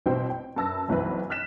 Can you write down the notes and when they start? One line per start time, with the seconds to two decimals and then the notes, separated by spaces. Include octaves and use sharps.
0.06 A1 B2 C4 F#4 C5 G5
0.30 G5
0.56 F#2 B4 A5 E6 A#6
0.88 F#1 B1 E3 C4 B4
1.30 F6 F#6 B6 E7